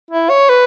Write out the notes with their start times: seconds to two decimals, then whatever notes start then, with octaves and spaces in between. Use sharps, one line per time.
0.11 E4
0.30 C#5
0.49 B4